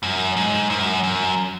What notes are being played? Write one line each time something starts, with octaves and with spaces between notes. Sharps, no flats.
F#2
G#2
F#2
F#2